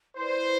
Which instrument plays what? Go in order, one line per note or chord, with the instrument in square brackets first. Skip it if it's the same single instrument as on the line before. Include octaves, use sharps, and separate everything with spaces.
[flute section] E4 B4 D5 [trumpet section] C5